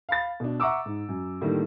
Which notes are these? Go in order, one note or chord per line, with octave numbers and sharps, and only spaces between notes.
F5 B5 A6
B2 D4
E5 F#5 A#5 C#6 D6 E6
G#2
F#2
A2 D3 D#3 G3 A3 A#3